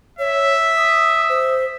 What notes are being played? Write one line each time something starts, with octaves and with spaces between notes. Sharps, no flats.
C#5 E5
D#6
C5